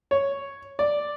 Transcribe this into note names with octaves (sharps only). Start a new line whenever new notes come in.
C#5
D5